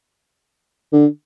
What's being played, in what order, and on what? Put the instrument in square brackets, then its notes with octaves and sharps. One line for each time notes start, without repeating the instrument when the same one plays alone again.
[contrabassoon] D3